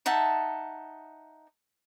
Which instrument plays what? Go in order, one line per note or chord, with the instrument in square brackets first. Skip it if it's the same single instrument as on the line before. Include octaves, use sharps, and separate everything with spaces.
[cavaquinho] D#4 E5 F#5 A5